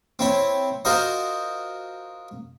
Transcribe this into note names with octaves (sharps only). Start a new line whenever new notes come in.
C4 E4 C#5
F4 F#4 A#4 C5 D#5